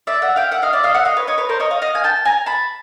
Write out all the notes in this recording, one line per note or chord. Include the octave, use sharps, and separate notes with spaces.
D5 E5
E5 F#5
F5 G5
E5 F#5
D#5 F5
D5 E5
D#5 F5
E5 F#5
D#5 F5
B4 C#5
C#5 D#5
B4 C#5
A#4 C5
C#5 D#5
D#5 F5
D#5 F5
G#5
G5 A5
G#5 A#5
A5 B5